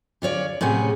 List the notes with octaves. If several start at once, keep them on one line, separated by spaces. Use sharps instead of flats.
D3 F4 C#5 D5
A2 C3 C#4 G#4 F#5